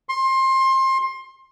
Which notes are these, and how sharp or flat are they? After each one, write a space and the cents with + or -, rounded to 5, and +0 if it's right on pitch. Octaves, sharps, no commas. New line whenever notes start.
C6 +25